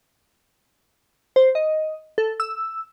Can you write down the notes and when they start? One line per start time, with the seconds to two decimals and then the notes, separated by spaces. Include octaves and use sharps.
1.36 C5
1.55 D#5
2.18 A4
2.40 E6